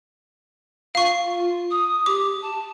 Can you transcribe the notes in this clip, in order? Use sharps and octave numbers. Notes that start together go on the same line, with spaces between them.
F4 F5 C#6
D#6
G4 D6
A5